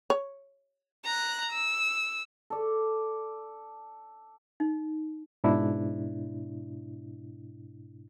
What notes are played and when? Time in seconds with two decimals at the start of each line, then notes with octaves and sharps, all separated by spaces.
0.10 C#5
1.05 A#5 F#6
1.52 E6
2.50 A4 D5
4.60 D#4
5.44 G#2 B2 D4 E4